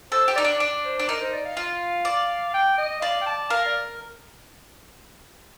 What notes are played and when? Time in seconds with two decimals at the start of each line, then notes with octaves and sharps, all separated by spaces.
0.12 A4 C5
0.28 G4
0.35 D#4 D5
0.45 D4
0.60 D4
0.85 C5
1.00 D4
1.09 D#4 A#4
1.20 C5
1.33 D5
1.45 F5
1.57 F4
2.05 D5
2.54 G5
2.78 D#5
3.01 D5 F5
3.21 G5
3.26 A5
3.50 A#4 F5
3.66 D5